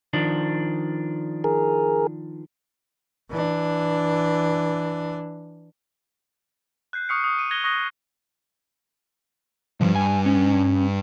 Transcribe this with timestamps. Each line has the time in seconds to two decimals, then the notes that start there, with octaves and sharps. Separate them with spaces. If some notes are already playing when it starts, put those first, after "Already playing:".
0.13 D#3 F3 D4
1.44 G#4 A#4
3.30 E3 D4
6.93 F#6 G6 C7
7.09 C#6 D#6 F6 C7 C#7
7.24 D#6
7.39 D#7
7.51 F#6 G#6 A#6 F7 G7
7.64 C#6 D#6 F#6 A#6
9.81 C2 G2 F3
9.95 G#5
10.26 C#4